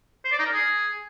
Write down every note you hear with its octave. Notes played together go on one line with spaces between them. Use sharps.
C5
D5
D#4
A#4
G#4